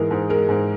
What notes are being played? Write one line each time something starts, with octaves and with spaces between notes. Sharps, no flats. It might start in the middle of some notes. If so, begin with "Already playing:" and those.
Already playing: G#2 E3 G#3 G#4 A#4
G#2
G#3 A#4
G#2